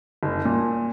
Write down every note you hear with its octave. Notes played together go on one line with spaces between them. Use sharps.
F#1
A#2